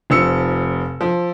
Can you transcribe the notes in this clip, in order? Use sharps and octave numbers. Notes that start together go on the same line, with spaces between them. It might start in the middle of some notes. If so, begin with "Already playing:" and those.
F1 F3 E6 C#7
F3